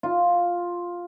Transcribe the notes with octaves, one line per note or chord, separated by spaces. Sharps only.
F4